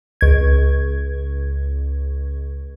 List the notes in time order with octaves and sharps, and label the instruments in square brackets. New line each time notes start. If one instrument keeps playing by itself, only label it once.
[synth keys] C#2 G#6